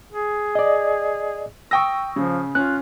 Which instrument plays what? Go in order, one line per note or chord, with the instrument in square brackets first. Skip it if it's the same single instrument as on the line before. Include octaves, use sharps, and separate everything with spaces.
[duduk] G#4
[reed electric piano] D5 D#5
[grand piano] G5 D#6 A#6 [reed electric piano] C#6 E6
[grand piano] C#3 [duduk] F3
[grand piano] C#4 [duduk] F4 [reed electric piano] F#6